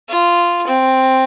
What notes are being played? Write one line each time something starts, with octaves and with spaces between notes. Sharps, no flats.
F4
C4